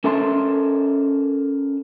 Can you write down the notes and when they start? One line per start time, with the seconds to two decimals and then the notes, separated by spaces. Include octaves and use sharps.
0.04 C#4 A4 A#4 E5 A5 C6